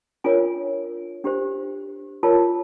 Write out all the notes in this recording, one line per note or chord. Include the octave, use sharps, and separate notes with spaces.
D4 F4 A#4 C#5 G#5
D4 G4 C5
F4 A#4 C#5 A5